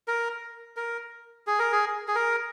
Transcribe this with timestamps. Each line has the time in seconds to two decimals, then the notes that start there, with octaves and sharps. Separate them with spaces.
0.08 A#4
0.77 A#4
1.47 G#4
1.59 A#4
1.72 G#4
2.08 G#4
2.15 A#4